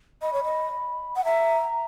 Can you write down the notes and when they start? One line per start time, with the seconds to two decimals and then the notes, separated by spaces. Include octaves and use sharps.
0.22 D#5 B5
0.33 C#5
0.44 D#5
1.16 F#5
1.24 E5 A#5